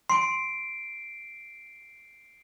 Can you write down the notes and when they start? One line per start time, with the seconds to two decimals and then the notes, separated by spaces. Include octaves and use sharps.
0.10 C6 C7 D7